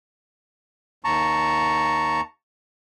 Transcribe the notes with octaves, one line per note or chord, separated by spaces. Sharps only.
D#2 A5 A#5 C#6